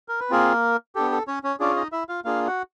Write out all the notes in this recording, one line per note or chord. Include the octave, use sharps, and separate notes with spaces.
A#4
B4
A#3 C4 F4 G#4 A#4
B3 D4 G4 A4
A4
C#4 C#5
C#4 C#5
C#4 D4 F4 G#4 D5
D#4 D#5
E4 E5
F4 F5
A#3 D4 F4 G#4 F5
F#4 F#5